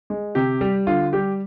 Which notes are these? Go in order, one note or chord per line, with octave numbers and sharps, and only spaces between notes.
G#3
C3 G4
G3
D3 F4
G3 G4